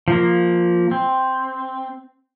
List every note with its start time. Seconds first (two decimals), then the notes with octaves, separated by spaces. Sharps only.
0.08 F3 A#3
0.91 C4